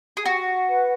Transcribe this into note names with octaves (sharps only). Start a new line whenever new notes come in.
G#4
F#4 F#5
B4